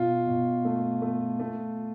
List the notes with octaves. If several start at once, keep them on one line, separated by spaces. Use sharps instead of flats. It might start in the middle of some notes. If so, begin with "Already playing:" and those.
Already playing: B2 F4
B2
A3
A3
A3